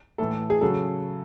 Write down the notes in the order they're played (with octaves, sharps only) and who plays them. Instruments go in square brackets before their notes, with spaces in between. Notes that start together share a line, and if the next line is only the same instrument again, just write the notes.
[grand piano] A2 E3 A4
G#4
C#3 F#3 A4